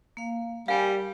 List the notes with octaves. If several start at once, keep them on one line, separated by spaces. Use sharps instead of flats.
A#3 F5
G3 G4 A#4 F5 G#5